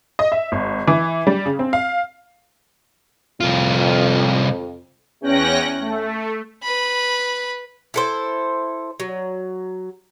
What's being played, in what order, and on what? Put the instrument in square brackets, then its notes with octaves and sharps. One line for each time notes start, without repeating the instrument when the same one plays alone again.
[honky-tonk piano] D#5
E5
G#1
E3
G3
C#3
C4
F5
[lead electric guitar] C2 F4 [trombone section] F2
[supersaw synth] E2 C#4 G5 F#6 A#6
A3
[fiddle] B4 B5
[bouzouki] E4 A4 C5
F#3